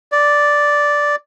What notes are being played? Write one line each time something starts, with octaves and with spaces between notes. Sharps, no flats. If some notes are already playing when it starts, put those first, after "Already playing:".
D5